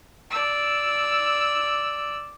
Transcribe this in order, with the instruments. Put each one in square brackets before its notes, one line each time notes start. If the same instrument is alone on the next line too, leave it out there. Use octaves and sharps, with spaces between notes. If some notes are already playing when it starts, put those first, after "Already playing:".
[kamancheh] D5 E6